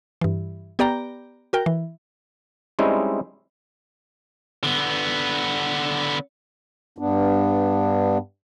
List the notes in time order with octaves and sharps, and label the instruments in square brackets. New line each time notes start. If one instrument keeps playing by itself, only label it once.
[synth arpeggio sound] G2 E3
B3 G4 D5 G5 A#5
F#4 A#4 G5
E3
[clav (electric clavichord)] G3 G#3 C4 C#4 D#4 E4
[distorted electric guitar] D3 B3
[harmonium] G2 B3 D4